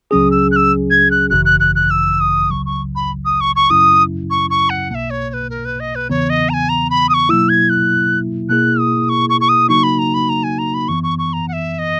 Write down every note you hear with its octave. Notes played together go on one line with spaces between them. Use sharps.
C#2 C#3 F#3 C#4 G#4 D#6
E6
F#6
E6
G#6
F#6
G#1 F#2 C#3 E3 F#6
F#6
F#6
F#6
E6
D#6
C#2 C#3 F#3 C#6
C#6
B5
D#6
C#6
C#6
F#2 C#3 F#3 C#4 E4 D#6
C#6
C#6
F#5
B1 B2 A#3 E5 F#5
C#5
C#5
B4
A#4
B4
D#5
B4
E2 C#3 E3 B3 C#5
D#5
A#5
G#5
A#5
B5
D#6
C#6
B2 F#3 A#3 E4 E6
G#6
F#6
B2 A#3 E4 G#4 F#6
D#6
C#6
C#6
C#6
D#6
C#3 F#3 A#3 D#4 F#4 C#6
B5
A#5
B5
A#5
G#5
A#5
B5
F#2 E3 B3 C#6
C#6
C#6
A#5
F#5
E5
D#5